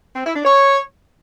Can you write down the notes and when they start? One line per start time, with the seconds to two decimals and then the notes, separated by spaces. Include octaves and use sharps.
0.16 C4
0.25 E4
0.35 D4
0.45 C#5